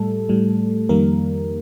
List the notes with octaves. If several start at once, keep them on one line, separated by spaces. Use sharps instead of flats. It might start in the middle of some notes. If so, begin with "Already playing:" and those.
Already playing: A2 G3 A3 A4
A2 G3
F2 D#3 G3 A#3 A#4